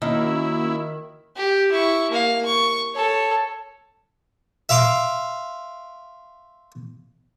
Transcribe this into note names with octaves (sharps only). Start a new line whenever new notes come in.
D#3 A#3 C#4 E4 F#4
G4
E4 C#6
A#3 F5
C#6
A4 C#5
E5 F5 C6 D6